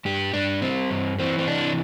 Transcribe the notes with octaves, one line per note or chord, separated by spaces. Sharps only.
G2 G4
G2 D4
G3 C4
G2
E3 C4
C4
C3 D4